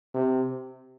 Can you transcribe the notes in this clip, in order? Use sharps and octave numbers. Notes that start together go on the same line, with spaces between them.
C3